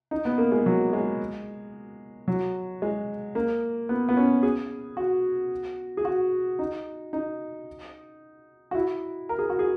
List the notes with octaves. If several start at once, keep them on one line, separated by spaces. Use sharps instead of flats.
D#4
B3
A#3
G#3
F#3
G#3
F#3
G#3
A#3
B3
B3
C#4
G#4
F#4
G#4
F#4
D#4
D#4
F#4
E4
A#4
G#4
F#4
G#4